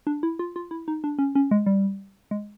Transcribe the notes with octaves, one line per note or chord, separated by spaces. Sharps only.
D4
E4
F4
F4
E4
D#4
D4
C#4
C#4
G#3
G3
G#3